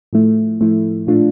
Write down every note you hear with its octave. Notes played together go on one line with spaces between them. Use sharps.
A2 F3 A3 E4
A2 F3 A3 E4
A#2 A3 D4 F4